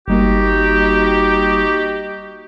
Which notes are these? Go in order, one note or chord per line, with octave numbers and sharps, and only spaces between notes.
G1 G3 A#3 D#4 F#4 G4